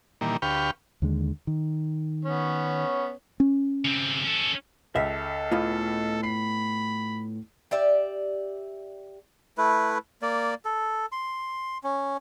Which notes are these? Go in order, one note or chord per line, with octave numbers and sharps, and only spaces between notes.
A#2 D#3 E3 G3 A#3
D2 G4 B4 F5 G5 C#6
D#2 D3 G#3
D#3
B3 C#4 C#5
C#4
C#3 C4
C#4 A4
C#2 A4 E5
A2 B3 F4
B5 C7
G4 D5 E5
A3 E4 B4
A#3 D5
A4
C6
C#4